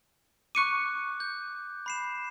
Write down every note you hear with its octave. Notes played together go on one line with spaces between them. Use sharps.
C#6 D6 F#6 C#7 D#7
G6
B5 C7 E7